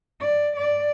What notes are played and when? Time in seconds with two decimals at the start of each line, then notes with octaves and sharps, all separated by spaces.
0.21 D5
0.57 D5